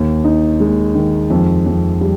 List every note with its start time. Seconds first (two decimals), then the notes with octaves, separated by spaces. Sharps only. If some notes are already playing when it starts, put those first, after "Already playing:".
Already playing: D#2
0.24 D#4
0.60 G#3
0.95 D#3
1.30 F2
1.66 F2
2.01 G3